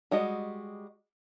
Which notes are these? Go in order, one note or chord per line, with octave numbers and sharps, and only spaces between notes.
G3 G#3 F#4 D#5